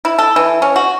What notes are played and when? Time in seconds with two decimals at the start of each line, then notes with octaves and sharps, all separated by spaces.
0.05 E4
0.19 A4
0.36 E3
0.62 C#4
0.76 F#4